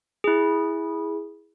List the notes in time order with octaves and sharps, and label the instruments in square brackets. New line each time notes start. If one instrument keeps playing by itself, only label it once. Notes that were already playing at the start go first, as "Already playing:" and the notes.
[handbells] E4 G#4